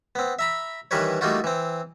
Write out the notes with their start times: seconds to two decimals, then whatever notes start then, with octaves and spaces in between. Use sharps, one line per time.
0.15 B3 C4
0.39 E5 A#5 B5
0.91 D#3 E3 G3 A#4 B4 C#5
1.21 G3 A3 A#3 D#4 F4 F#4
1.44 E3 C4